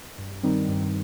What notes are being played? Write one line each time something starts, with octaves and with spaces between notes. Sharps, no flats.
G2
D#3 G3 C4 D#4
G2